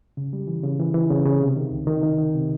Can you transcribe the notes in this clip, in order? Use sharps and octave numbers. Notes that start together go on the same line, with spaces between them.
C#3
G3
E3
C#3
E3
E3
C#3
C#3
C3
D#3
C2
D#3
D#3
D#3
C3